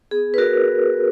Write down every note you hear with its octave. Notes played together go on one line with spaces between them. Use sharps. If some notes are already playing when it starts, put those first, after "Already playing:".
B3 G#4
B4
F#4 A#4